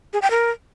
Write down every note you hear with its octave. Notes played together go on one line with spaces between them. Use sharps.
G#4
G5
A#4